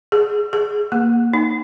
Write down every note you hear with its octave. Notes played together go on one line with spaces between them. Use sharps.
G#4
G#4
A#3
D#4